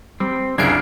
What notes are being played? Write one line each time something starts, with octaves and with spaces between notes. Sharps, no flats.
G3 C4
C2 F#2 C#3 D4 F4 G#6 C7 D7